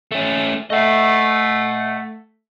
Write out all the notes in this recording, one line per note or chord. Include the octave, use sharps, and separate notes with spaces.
A3 C#4
A3 D#5 F#5